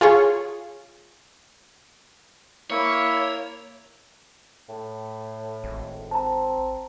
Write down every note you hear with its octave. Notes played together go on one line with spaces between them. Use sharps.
F4 G#4 C#5
A#3 E4 C#5
A2
G#1
C4 A5 A#5